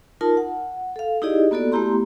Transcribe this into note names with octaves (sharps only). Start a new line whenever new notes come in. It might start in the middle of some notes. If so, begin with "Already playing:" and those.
D#4 F4 A#4 A5
F#5
A4 F5
D#4 E4 G4 G#4 D5 D#5
A#3 B3 F#4 A4 D5
A3 B3 E4 G4 A#5 C6